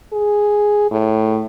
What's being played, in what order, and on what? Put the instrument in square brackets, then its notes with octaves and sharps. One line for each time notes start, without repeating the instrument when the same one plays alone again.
[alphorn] G#4
A2